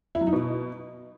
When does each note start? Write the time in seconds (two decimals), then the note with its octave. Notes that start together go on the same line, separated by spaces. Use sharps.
0.15 E4
0.21 F#3
0.27 D#4
0.33 B2